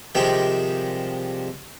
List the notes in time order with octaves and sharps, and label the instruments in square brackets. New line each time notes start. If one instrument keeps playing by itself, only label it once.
[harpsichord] C3 D#3 F3 G3 G#3 G4